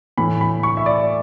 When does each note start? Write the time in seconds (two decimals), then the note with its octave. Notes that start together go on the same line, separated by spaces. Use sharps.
0.18 A2 E3 A3 B5
0.41 B5
0.63 C#6
0.77 E5
0.86 D5